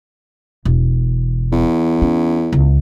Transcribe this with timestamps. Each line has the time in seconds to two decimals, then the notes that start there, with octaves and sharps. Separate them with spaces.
0.65 E1
1.52 E2
2.02 C#4
2.53 C#2